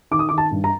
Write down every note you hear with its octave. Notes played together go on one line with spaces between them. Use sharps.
D#3 D6
D#6
D#3 D6
A5
G2
A#5